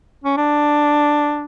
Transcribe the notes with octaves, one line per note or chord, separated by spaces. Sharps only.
C#4
D4